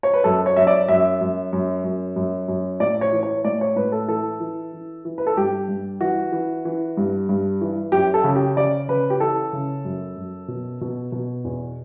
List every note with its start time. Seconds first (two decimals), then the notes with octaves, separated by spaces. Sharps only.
0.03 C#5
0.14 B4
0.24 F#2 A4
0.46 C#5
0.56 F#2 E5
0.67 D5
0.88 F#2 E5
1.21 F#2
1.53 F#2
1.84 F#2
2.16 F#2
2.48 F#2
2.80 A2 D5
3.01 C#5
3.12 E3
3.23 C#5
3.44 A2 D5
3.61 C#5
3.76 A2 B4
3.92 A4
4.08 E3 A4
4.40 E3
4.73 E3
5.05 E3
5.18 B4
5.27 A4
5.37 G2 G4
5.68 G2
6.01 E3 F#4
6.32 E3
6.65 E3
6.97 G2
7.29 G2
7.61 E3
7.92 F#2 G4
8.14 A4
8.24 C#3
8.35 G4
8.57 C#3 D5
8.89 C#3 B4
9.10 G4
9.20 E3 A4
9.53 C#3
9.85 F#2
10.16 F#2
10.48 B2
10.81 B2
11.12 B2
11.45 E2